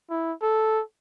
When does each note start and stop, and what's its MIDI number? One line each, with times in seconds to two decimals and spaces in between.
0.10 0.33 64
0.42 0.82 69